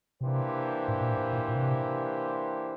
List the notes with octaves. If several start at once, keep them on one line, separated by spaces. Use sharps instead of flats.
C3 E3 A#3 D4 G4 C5
A2
A#2
A2
A#2
A#2
C3